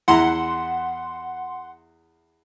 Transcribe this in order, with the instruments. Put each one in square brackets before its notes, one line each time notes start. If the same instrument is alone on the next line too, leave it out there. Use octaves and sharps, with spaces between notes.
[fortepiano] E2 E4 A#5 [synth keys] F#5 C6